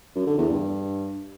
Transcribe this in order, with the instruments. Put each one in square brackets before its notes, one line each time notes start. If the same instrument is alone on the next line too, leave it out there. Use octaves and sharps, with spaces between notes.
[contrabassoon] F#2
D3
E2
G2